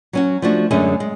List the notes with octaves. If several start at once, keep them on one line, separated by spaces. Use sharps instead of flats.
F#3 C#4 F#4
F3 A3 D4 F#4
F#2 D3 G#3 C#4 G#4
G#3